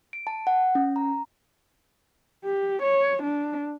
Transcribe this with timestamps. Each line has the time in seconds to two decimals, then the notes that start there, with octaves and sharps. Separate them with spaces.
0.13 D7
0.27 A5
0.47 F#5
0.75 C#4
0.96 A#5
2.44 G4
2.82 C#5
3.23 D4